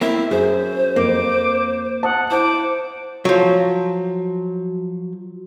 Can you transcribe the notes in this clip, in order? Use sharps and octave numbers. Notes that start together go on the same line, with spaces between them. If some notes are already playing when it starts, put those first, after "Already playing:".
A#3 C4 E4 E5
F#2 G#4 C5
F2 A#3 D6
F#5 A5 D#6
E4 C5 A5 D6
F3 F#3